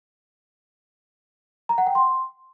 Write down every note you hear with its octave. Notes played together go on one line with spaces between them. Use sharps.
A#5
F#5
G5
C6